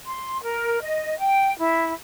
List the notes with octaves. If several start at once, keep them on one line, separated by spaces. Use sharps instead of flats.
C6
A#4
D#5
G5
E4